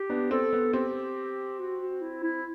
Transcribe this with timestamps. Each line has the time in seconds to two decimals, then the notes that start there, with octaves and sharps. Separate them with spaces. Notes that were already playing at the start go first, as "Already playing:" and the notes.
Already playing: G4
0.10 B3 D4
0.31 C4 A4
0.53 B3
0.73 C4 G4
1.59 F#4
1.81 F#4
2.01 E4
2.23 E4